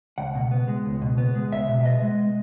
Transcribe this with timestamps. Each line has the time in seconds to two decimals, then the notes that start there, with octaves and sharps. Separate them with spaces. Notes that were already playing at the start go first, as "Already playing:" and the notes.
0.18 C#2 F#5
0.35 B2
0.51 B3
0.68 G#3
0.85 C#2
1.02 B2
1.18 B3
1.35 G#3
1.52 C#2 E5
1.68 B2
1.81 E5
1.85 B3 D#5
2.02 G#3